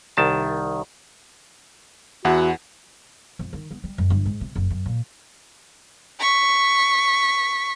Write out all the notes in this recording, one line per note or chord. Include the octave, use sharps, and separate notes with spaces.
C2 D#3 A5
E2 E4 F#4 F#5
F2
D#3
B3
G3
F#2
G1
G#2
C3
F#1
F#2
A#2
C#6 B6